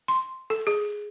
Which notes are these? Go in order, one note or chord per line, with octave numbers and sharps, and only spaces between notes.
C6
A4
G#4